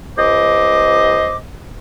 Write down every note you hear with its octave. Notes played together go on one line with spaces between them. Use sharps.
C#2 C5 D#5 D6